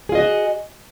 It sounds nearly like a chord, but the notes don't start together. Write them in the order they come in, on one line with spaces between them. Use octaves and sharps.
G#4 F4 D#5 F#4